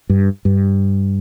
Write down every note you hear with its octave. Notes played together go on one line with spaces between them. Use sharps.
G2
G2